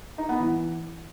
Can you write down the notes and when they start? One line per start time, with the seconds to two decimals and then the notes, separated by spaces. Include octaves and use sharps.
0.18 D#4
0.29 B3
0.40 E3